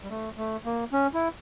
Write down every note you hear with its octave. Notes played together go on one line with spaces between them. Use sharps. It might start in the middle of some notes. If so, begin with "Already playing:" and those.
G3
A3
A3
A#3
C#4
E4